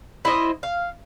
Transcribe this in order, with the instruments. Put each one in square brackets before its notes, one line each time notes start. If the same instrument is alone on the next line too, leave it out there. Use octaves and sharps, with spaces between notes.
[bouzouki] E4 C5 D#5
F5